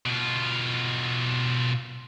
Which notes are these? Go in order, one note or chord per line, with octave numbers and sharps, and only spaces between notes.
B2 F4